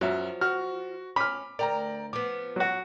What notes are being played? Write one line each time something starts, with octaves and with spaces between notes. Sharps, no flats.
F#2 F3 F#3 E5
F#4 F6
C#4 B5 D6 F6
D2 A#4 D5 G5 A#5
F3 B3 D6
F#3 F#4